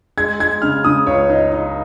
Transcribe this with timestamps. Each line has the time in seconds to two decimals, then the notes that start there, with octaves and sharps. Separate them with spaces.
0.17 G#3 G#6
0.40 G#3 G#6
0.62 C#3 F6
0.84 C#3 D#6
1.07 C#2 C#5
1.30 D#4
1.52 D#4